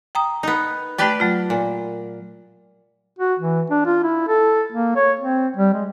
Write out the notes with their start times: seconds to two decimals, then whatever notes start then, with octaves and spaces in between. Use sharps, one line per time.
0.15 G5 A#5 D#6
0.43 B3 D#4
0.98 A3 G4 B4 D5 G5
1.20 F#3 A3 F4
1.50 A#2
3.19 F#4
3.39 E3
3.70 D4
3.85 F4
4.03 E4
4.28 A4
4.72 A#3
4.96 C#5
5.20 C4
5.57 G3
5.74 G#3